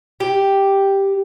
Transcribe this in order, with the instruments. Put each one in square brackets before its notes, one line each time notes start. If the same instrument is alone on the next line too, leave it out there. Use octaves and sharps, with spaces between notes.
[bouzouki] G4